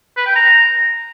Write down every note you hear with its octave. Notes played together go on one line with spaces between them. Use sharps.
B4
G5
A#5